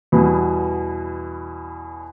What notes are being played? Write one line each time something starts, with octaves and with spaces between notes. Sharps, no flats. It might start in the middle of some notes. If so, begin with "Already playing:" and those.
E2 B2 G3 B3